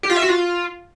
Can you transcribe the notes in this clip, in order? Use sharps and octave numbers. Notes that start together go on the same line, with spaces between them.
G4
F4
E5
F#4
F4